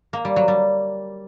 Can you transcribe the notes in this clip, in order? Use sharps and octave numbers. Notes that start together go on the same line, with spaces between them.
A#3
G3
F#3
G3